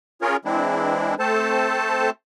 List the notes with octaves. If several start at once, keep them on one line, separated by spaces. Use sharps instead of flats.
C#4 F4 G#4 A#4 C#5
E3 G#3 C4 D4 E4
A3 C4 A4 C5 A5